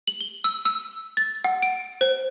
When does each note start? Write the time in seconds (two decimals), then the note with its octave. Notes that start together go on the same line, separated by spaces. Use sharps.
0.08 F#7
0.21 G7
0.44 E6
0.65 E6
1.17 A6
1.44 F#5
1.63 D7
2.01 C5